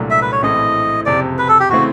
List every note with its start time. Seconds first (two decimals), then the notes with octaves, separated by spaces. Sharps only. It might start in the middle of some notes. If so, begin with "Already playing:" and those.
Already playing: C2 A#2 F#3 A3 D4
0.10 E5
0.22 B4
0.32 C#5
0.42 A#1 A2 E3 A3 C4 D#5
1.06 F#1 F2 C3 D5
1.38 B4
1.48 A4
1.60 G4
1.70 C#3 E3 A3 C4 F#4